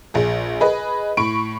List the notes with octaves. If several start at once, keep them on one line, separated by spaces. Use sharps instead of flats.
A#1 G#4
G#4 B4 D#5
A2 B5 C#6 D7